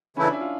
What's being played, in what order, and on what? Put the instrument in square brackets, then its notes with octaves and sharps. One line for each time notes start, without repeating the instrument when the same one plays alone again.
[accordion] C#3 E3 A3 E4 [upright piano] C#4
[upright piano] D4
E4
F4